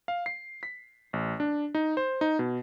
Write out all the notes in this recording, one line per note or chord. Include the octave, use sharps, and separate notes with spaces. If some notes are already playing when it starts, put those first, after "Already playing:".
F5
C7
B6
A1
D4
D#4
C5
D#4
B2